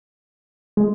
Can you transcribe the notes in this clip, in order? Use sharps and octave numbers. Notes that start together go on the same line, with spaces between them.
G#3